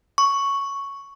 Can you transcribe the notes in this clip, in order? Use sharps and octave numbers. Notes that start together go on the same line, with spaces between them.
C#6